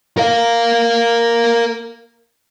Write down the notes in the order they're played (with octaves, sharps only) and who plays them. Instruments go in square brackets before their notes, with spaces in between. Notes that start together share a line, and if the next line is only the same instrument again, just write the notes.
[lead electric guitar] A#4 F5